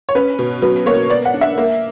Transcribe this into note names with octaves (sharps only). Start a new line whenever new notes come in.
C#5
C#4 B4
B2
F#3 B4
A#3 C#5
B3 D5
F#5
D4
E5
A#3